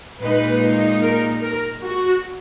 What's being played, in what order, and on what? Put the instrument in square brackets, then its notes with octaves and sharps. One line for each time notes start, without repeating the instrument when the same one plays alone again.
[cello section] A#2 G#3 D#4 [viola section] B4
[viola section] A#4
A#4
F#4